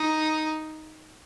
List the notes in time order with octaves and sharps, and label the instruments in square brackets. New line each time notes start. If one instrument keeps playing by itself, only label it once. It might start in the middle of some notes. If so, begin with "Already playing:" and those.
Already playing: [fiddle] D#4